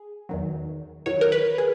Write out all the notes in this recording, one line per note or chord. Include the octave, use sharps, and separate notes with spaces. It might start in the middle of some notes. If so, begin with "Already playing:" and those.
Already playing: G#4
E2 D#3 F#3
E2 D#3 F#3 C#5
A#4
B4
G#4